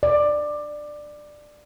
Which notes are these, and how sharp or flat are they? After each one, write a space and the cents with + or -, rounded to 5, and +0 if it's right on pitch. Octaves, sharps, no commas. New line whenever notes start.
D5 +15